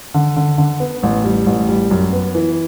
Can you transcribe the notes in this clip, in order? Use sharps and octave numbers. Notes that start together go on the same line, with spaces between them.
D3
D3
D3
B3
A1
G3
A1
G3
F#2
B3
E3